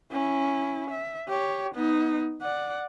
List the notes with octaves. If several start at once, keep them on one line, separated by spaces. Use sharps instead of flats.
C#4 E4
E5
G4 C#5
B3 D#4
D5 F#5